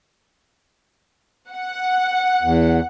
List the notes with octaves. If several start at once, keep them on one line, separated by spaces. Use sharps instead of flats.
F#5
E2